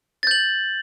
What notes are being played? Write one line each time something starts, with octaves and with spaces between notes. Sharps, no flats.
G6 A6 F#7